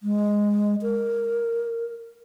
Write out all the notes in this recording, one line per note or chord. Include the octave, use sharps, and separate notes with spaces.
G#3
A#4